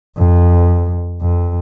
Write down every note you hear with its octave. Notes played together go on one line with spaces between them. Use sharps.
F2
F2